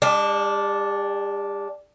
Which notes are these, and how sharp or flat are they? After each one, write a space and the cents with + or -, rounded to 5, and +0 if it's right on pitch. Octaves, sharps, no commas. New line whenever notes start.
G3 +45 D4 -5